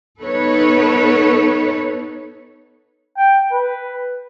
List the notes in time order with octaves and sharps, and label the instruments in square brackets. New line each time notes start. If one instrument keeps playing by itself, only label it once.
[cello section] B3 D#4 A4 B4 C#5
[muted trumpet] G5
B4